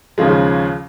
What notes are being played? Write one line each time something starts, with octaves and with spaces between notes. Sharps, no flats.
D#2 C#3 F3 G#3